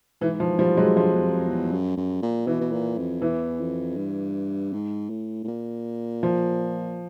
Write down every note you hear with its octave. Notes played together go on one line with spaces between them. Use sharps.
G#2 E3
F3
F3 G3
F#3 G#3
G2 F3
E2
F2
E2
F#2
F#2
A#2
B2 E3
B2
A#2
F2
E2 E3
F2
G2
G#2
A2
A2
A#2
F3